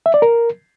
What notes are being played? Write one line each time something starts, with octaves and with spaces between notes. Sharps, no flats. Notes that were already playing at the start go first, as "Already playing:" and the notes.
E5
D5
A#4